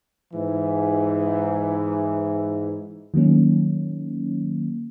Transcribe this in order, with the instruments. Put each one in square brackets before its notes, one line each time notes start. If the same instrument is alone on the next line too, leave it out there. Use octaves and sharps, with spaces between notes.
[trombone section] G#2 E3
[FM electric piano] D#3 F#3 A#3 C#4